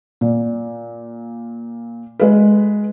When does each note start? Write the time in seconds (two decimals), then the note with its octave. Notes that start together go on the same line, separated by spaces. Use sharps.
0.21 A#2
2.19 G#3 B4